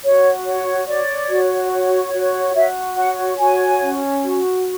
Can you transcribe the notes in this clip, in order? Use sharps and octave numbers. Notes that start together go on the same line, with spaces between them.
F#4 C#5
C#5
C#5 D5
F#4
C#5
F#4
F#4 E5
C#5 F#5
F#4 G#5
C#4
F#4